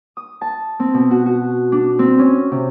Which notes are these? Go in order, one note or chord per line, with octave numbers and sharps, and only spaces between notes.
D#6
A5
C4
B2
F#4
F#4
D4
C4
C#4
C3